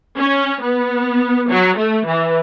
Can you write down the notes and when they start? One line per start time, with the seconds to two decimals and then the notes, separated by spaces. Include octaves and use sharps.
0.18 C#4
0.62 B3
1.49 F#3
1.78 A3
2.07 E3